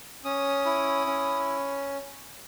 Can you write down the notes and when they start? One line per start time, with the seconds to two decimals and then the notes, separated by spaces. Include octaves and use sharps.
0.25 C#4 D#6
0.66 E4
1.06 C#4